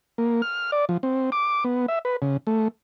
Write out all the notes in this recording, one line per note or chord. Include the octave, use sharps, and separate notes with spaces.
A#3
F6
D5
F3
C4
D6
B3
E5
B4
C#3
A3